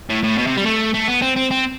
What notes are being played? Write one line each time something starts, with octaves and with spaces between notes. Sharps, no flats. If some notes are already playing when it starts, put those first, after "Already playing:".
A2
A2
B2
C3
G3
A3
A3
B3
C4
C4
C4